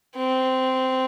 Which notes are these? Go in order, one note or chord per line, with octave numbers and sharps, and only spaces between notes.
C4